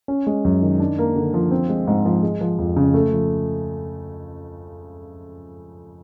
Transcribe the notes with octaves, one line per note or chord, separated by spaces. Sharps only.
C#4
G#3
F#2
D#3
D4
A#3
D3
F3
C4
G#3
G#2
F3
G#3
F3
F2
C#3
A3
F3